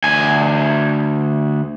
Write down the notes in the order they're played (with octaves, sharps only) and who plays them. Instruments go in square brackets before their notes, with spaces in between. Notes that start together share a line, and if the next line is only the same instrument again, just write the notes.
[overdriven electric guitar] D2 G#5